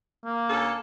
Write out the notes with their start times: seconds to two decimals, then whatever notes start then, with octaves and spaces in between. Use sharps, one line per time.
0.24 A#3
0.49 D2 C#4 A4